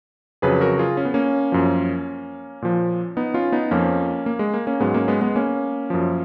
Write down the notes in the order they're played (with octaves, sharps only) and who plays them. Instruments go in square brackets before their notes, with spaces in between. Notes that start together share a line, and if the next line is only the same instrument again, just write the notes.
[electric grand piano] F2 C#3 F#3 G#4 B4
F#4 A#4
F4 G#4
C#4
B3
A#3 C#4
F#2 F3
A#2 F3
B3 D#4
C#4 F4
B3 D#4
F2 F3 A#3 C#4
A#3
G#3
A#3
A#3 C#4
G#2 F#3 G#3 B3
A#3 C#4
G#3 B3
G#3 B3
A#3 C#4
F#2 F3